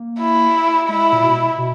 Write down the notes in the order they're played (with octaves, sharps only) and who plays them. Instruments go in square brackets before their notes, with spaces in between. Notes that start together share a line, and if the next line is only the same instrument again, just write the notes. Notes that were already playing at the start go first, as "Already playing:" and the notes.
Already playing: [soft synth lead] A#3
[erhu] E4
[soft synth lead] G#3 [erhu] E4
[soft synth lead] A#2
B2
B2